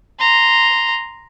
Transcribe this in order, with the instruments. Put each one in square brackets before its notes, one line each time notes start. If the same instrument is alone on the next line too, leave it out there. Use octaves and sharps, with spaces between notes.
[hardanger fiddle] A#5 C6